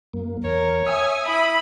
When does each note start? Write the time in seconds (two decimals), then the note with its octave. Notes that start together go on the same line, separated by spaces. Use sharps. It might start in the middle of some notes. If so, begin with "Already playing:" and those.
0.13 F#2 A#3
0.44 E2 A#4 C#5
0.86 E5 G#5 D#6
1.28 E4 B5